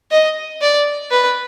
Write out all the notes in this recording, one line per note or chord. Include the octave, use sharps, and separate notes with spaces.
D#5
D5
B4